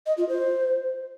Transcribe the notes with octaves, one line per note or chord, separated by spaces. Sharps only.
D#5
F4
C5